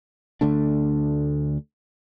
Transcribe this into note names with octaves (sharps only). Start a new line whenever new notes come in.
D2 D3 A3 D4